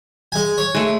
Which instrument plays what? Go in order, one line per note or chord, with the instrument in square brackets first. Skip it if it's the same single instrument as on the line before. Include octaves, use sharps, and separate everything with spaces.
[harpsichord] G#3 G#5
C#5
[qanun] G#3 A3